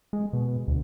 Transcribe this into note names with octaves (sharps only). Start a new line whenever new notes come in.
G#3
B2
D2